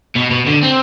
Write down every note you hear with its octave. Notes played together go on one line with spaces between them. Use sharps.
B2
B2
D3
C4